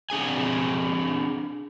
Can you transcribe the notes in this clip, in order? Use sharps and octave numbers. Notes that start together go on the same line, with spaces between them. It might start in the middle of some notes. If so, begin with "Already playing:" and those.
C4 D4 G#4 G#5